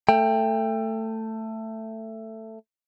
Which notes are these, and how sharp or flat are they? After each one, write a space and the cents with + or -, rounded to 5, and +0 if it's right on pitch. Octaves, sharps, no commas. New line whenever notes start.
A3 +15 G5 +20